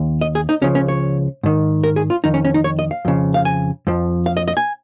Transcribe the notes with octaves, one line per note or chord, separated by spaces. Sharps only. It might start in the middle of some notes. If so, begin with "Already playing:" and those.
Already playing: D#2
D#5
G#4
D#4
C#2 C#3 F3 C#4
C#4
C#5
G#2 D#3
A#4
G#4
F4
F2 D#3 D#4
C#4
C#4
D#4
C#5
D#5
F5
F2 C#3 F3
F5
G#5
F2 F3
F5
D#5
D#5
G#5